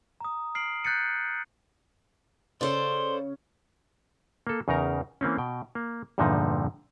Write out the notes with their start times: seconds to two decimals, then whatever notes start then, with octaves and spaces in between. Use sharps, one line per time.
0.21 A#5 D#6
0.55 F6 C7 D7 F#7
0.84 F#6 G6 A6 B6 C#7 D#7
2.61 C#3 C#4 A4 C5 D5 C6
4.47 A#3 A4
4.68 E2 C#3 D#4 A#4 A#5
5.21 E3 A#3 C4 C#4
5.38 B2 G5
5.75 A#3
6.18 E2 G2 A#2 D3 F3 D#4